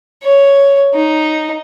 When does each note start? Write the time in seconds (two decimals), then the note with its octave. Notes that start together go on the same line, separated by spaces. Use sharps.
0.23 C#5
0.94 D#4